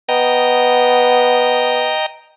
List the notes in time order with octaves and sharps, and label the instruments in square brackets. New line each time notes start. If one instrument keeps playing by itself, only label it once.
[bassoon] B3 [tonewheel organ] D#5 G5 A#5